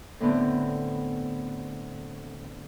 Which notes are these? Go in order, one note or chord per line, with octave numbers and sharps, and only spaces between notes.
A2 D3 B3 C4